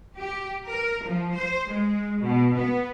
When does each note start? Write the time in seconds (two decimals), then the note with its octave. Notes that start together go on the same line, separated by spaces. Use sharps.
0.18 G4
0.67 A#4
1.05 F3
1.35 C5
1.69 G#3
2.22 B2
2.56 B3